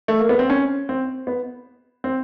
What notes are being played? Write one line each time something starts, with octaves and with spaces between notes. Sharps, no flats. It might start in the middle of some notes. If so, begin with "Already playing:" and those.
A3
A#3
B3
C4
C#4
C4
B3
C4